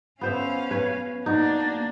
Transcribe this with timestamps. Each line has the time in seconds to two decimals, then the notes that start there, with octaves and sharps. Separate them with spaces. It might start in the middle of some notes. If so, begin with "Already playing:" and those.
0.21 B3 C#4 C5 E5 F5
0.71 B4 C#5
1.26 A#3 D4 D#4 F#4